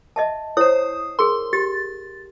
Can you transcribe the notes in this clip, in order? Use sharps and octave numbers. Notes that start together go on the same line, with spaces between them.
D#5 E5 A5
E4 C5 C#5 D#6
G#4 A#4 C6
G4 A6